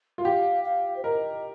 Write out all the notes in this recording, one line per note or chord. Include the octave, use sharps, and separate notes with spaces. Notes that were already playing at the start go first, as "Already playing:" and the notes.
F4
G4 F5
F5
C5
A#4 D#5